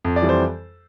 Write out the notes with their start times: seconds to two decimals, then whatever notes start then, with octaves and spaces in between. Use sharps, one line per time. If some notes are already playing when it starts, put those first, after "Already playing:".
0.04 F2
0.16 D5
0.22 E3 G3
0.29 C5